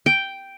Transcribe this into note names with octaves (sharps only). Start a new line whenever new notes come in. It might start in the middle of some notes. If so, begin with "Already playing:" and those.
G5